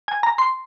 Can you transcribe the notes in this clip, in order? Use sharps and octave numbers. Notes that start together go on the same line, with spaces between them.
G#5
A#5
C6